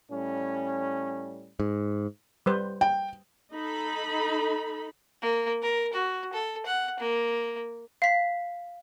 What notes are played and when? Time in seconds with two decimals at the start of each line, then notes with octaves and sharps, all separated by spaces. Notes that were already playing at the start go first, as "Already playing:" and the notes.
0.11 A2 G3 C#4
1.60 G#2
2.46 G3 B4 C5
2.81 G5
3.54 D#4 A4 B5
5.22 A#3
5.62 A#4
5.93 F#4
6.33 A4
6.66 F#5
7.00 A#3
8.02 F5 B6